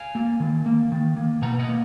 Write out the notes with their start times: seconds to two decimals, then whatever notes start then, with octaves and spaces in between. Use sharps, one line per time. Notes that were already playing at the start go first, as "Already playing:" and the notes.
Already playing: F5 G#5
0.15 A#3
0.40 D#3
0.66 A#3
0.92 D#3
1.17 A#3
1.42 B2 F#5 A#5
1.59 D#5 F#5
1.69 A#3